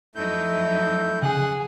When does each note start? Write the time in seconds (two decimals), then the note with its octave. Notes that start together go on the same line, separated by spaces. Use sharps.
0.15 F2 F#3 A3 D#4 E4 G6
1.22 C#3 G#4 F#5 F#6